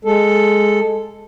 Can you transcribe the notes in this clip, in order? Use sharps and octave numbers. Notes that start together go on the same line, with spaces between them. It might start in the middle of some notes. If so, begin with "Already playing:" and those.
G#3 A4